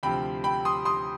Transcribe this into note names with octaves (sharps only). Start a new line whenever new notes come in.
D2 C3 F3 G5 B5
G5 B5
C6 D#6
C6 D#6